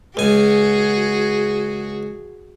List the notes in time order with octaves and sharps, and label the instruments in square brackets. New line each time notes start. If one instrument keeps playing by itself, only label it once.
[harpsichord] C#2 G#5 [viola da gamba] F#4 G#4